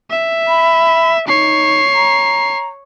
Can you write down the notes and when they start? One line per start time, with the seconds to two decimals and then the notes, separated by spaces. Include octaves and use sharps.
0.10 E5
0.48 B5
1.28 D#4 C#5 C7
1.94 A#5